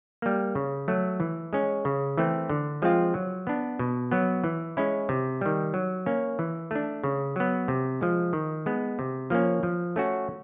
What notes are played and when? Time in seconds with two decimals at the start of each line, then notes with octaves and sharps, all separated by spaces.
0.22 G3 A#3
0.55 C#3
0.88 F#3 A3
1.20 E3
1.53 G#3 C#4
1.85 C#3
2.17 E3 A3 C4
2.49 D3
2.82 F3 G#3 C4 F4
3.14 F#3
3.47 B3 D4
3.79 B2
4.11 F#3 B3
4.44 E3
4.77 G#3 C#4 E4
5.09 C3
5.41 D#3 G3
5.74 F#3
6.06 A#3 C#4
6.39 E3
6.71 A3 D4
7.04 C#3
7.36 F#3 B3
7.68 C3
8.01 F3 G#3
8.33 D#3
8.66 G#3 B3
8.99 C3
9.30 F3 A#3 C#4
9.63 F3
9.96 A3 C#4 F#4